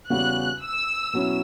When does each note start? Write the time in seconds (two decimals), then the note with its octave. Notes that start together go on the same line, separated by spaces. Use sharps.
0.10 E2 C#3 G3 C#4 F#4 F#6
0.63 E6
1.13 B2 F#3 C#4 E4